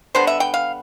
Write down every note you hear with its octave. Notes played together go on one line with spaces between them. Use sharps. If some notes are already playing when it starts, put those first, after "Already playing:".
D3 G3 B3 D4 C5
E5
G5
F5